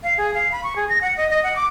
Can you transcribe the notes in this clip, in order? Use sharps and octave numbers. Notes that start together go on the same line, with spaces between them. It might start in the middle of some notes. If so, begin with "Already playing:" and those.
F5
G#4
F5
B5
C#6
G#4
A#6
F#5
D#5
D#5
F#5
D6